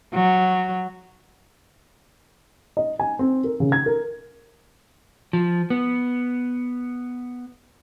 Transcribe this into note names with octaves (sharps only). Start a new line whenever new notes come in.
F#3
D#5
G#5
C4
A#4
C#3
G#6
A#4
F3
B3